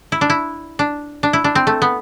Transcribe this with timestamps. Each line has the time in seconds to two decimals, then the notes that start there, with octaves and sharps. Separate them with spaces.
0.12 E4
0.21 D4
0.30 E4
0.79 D4
1.23 D4
1.33 E4
1.44 D4
1.55 C4
1.67 A3
1.82 B3